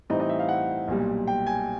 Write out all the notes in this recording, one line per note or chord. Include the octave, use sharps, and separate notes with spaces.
A2 E3 G3 C4 D#4 D#5
D#5
E5
F5
F#5
B1 A#2 G3
G5
G#5